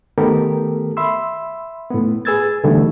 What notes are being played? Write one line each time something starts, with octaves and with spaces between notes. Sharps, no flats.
D#3 A3 B3 G4 A4 A#4
E5 B5 C6 E6
A2 B3
G#4 B4 E6 G#6 A6
B2 D3 E3 G3 A3 D#4